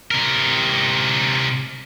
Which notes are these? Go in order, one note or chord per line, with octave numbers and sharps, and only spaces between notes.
C3 A#4